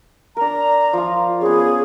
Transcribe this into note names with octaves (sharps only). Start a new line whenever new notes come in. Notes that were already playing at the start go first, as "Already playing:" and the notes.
D4 A#4 A#5
F3 F4
B3 C#4 G#4